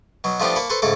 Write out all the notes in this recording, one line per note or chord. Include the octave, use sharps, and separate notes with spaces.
B2 F#3
F3 A3 B3 D4 F4 G4
A#3 A5 B5 C#6
A4 B4 C5 A5 C#6
G#2 C#3 A3 A4 D6